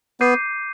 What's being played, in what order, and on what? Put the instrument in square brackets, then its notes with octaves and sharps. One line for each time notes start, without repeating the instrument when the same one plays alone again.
[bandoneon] B3 [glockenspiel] D6 G6 C7 D#7